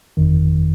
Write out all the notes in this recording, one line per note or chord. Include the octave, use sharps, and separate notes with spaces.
G1 F2 D#3